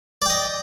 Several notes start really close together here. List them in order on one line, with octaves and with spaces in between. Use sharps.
D5 G5 D#5